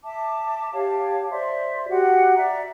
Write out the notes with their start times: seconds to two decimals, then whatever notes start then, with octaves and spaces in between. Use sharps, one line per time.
0.04 E5 A5 D6
0.73 G4 C#5 F5 A5
1.31 C5 D5 E5 C6
1.89 F#4 G4 F#5
2.35 D5 E5 A#5